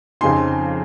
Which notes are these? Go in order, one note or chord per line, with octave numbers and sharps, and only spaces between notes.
F2 C#3 F3 C4 D#4 G#5 C6